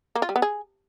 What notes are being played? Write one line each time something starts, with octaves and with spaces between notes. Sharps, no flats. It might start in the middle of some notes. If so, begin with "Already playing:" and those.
A#3
F4
G3
B3
G#4